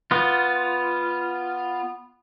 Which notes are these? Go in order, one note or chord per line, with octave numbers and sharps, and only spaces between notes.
B3 F4